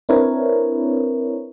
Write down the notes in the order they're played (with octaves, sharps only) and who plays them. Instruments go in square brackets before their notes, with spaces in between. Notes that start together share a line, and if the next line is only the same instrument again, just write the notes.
[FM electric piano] C4 D4 E4 A#4 B4 C#5